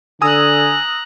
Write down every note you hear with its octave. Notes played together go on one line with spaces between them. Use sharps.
D3 G#5 A#5 D#6 E6 F#6